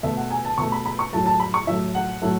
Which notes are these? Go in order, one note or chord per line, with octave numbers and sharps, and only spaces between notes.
B2 A3 E5
F#5
G#5
A5
B2 A3 C#6
B5
B5
C#6
A2 F#3 A3 A5
A5
B5
C#6
A2 F#3 A3 E5
F#5
A2 F#3 A3